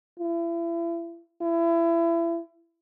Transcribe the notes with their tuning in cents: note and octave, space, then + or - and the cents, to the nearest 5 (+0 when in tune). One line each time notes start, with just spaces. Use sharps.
E4 +35
E4 +30